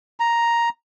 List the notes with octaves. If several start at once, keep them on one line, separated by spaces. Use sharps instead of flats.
A#5